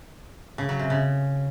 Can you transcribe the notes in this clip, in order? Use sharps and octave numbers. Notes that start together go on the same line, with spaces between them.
C#3
F#3
C3
C#3